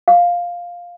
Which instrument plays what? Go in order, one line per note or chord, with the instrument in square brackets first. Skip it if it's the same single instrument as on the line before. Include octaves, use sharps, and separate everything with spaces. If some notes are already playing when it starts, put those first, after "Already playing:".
[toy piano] F5